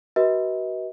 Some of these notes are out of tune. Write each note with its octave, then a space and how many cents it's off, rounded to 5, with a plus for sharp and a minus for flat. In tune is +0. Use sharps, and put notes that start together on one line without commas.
F#4 +25 B4 -35 D#5 +40